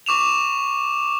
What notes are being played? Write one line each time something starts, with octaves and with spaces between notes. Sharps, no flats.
C#6 D6 E7 F7